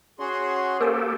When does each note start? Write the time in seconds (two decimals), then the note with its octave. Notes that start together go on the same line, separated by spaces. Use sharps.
0.19 C#4 F#4 G#4 C6
0.81 A#3 G4 A4 A#4 C5 G#5